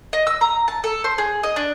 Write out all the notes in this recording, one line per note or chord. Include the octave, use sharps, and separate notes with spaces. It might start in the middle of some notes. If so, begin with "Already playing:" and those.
D#5
E6
A#5
A5
A4
C5
G#4
D#5
D4